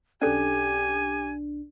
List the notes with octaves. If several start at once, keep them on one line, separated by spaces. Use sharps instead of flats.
B1 C#4 D4 G4 A4 G#5